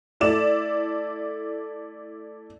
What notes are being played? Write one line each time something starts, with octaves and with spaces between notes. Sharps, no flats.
A3 E4 D5 E7